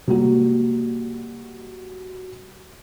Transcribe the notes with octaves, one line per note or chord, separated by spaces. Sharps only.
C3 G3 G#3 A#3 F#4